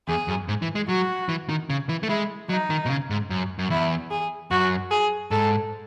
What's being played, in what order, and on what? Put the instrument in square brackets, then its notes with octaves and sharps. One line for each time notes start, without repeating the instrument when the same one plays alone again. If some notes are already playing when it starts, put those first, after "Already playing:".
[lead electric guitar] E2 [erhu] G#4
[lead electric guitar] F#2
G#2
E3
G#3
[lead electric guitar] F#3 [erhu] F#4
[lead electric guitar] E3
D#3
C#3
E3
A3
[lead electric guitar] G#3 [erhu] E4
[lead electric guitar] F#3 [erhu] D#4
[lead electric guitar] D#3
B2
C#3
G#2
F#2
F#2
[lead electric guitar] E2 [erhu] E4
[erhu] G#4
[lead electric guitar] F#2 [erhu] F#4
[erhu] G#4
[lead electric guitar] G#2 [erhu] A4